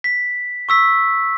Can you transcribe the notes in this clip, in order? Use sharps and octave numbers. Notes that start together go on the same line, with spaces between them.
B6
C#6 E6 B6